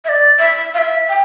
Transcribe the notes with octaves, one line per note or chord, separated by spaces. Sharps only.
E5
D5
E5
F5
E5
G5